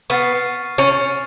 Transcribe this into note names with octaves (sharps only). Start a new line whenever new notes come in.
B3 C#6 F6 A6 C7
C#4 C#6 F6 A6 C7